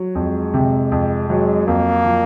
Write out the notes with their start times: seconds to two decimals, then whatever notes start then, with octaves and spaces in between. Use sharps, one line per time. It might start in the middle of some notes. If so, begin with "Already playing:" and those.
Already playing: F#3
0.15 F2 G#3
0.54 C3
0.92 F2
1.30 F#3 G#3
1.67 F2 A#3
2.05 F3